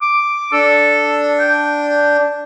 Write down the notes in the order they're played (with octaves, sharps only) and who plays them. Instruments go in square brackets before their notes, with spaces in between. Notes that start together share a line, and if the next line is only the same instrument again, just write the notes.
[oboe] D6
[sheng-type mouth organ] D4 [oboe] A4
[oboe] G5